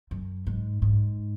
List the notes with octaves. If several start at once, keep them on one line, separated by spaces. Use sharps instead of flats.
F#2
G#2
G#2